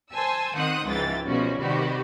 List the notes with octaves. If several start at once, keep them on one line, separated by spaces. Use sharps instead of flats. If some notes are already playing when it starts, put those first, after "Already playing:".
C5 G#5 A5 E6
D#3 C4 C5 F#5 D#6 F#6
C#2 G#2 E3 F3 G5 A6
B2 F3 G3 C#4 F#4
C3 D#3 G3 F#4 G4 B4